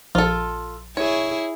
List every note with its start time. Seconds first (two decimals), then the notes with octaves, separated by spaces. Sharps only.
0.15 A#1 F4 A4
0.97 E4 G#4 C#5